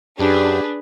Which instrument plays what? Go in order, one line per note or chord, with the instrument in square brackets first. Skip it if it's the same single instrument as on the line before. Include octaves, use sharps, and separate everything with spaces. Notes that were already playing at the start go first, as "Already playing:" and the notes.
[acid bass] F#2 [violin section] D4 [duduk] G4 [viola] G#4 B4